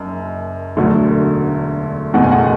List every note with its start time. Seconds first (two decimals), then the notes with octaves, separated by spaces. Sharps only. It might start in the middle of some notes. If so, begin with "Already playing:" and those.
Already playing: F#1 F#2
0.76 E1 D2 D3 F#3 A3
2.14 F#1 E2 B2 A3 F#5
2.23 G#5
2.32 F#5